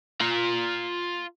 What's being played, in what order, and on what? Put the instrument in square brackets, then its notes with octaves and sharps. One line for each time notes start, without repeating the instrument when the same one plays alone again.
[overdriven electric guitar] F4 A#5